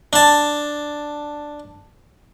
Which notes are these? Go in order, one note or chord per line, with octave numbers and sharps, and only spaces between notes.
D4 A5